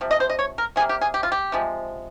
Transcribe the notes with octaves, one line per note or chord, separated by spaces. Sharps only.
C3 F3
D#5
C5
D#5
C#5
A#4
C3 G3 A#3 G#4
G4
G#4
G4
F4
G4
C3 F3 G#3